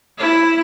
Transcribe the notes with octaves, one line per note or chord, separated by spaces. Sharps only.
E4